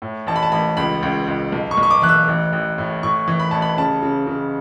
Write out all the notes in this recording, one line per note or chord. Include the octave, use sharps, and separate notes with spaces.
A2
A1 A5
B5
A5
A1 B5
C#2 B5
C#2
C#2
B1
C#6
B1
C#6
D6
E3 F#6
E6
A1
A1
A2
A2 C#6
E3
B5
A1 A5
B5
C#3 A5
C#3
C#3